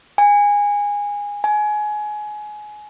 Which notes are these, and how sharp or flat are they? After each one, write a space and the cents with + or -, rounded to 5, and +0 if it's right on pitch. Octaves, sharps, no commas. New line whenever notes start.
G#5 -20
G#5 +20